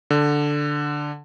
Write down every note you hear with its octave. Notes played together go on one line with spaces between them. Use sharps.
D3